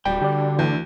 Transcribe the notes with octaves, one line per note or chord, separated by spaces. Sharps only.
D1 G3 F#4 G5
D3 G4 D5
D2 E3